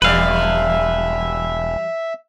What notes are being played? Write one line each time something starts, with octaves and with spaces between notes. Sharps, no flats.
E1 E2 G3 B4 D5 E5 F5